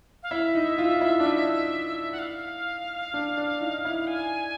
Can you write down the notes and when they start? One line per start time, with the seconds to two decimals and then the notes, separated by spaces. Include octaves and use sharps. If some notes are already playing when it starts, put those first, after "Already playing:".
0.23 F5
0.31 E4 E5
0.55 D#4
0.78 F4
1.01 E4
1.20 D4
1.26 D#4
2.12 F#5
2.19 F5
3.14 D4
3.37 D4
3.61 D#4
3.85 E4
4.07 G#5